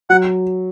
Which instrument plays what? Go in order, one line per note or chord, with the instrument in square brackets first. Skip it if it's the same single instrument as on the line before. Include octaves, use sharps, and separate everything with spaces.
[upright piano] F#3 [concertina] F#5